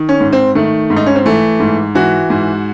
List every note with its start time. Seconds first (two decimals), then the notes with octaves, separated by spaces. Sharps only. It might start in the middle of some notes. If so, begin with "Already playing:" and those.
Already playing: D#3
0.09 C#4
0.20 G#2
0.33 C4
0.55 D#3 A3
0.90 G#2
0.96 D#4
1.06 C#4
1.15 C4
1.25 E3 A3
1.60 G#2
1.95 E3 F#4
2.30 G#2